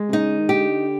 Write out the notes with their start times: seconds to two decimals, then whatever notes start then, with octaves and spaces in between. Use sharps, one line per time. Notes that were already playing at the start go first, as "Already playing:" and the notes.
Already playing: G#3
0.08 C3
0.13 C#3 D#4
0.39 D#3
0.49 D3 G4